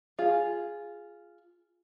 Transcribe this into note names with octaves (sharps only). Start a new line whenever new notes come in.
F4 G#4